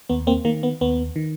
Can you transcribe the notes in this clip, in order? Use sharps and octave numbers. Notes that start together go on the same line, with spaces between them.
D#2 B3
A#3 C4
D#3 A#3
B3
D#2 B3
D#3